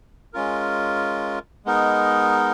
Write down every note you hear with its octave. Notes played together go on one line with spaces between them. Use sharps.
G#3 C#4 F4 A#4
G#3 B3 D#4 A#4